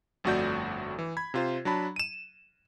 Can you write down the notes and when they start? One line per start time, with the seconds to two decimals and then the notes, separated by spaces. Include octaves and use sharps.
0.24 G1 F2 A3 F#4 D5 G6
0.99 E3
1.17 B5 G#6
1.34 C3 F4 C5
1.65 F#3 D4 A5 B5
1.96 D#7 E7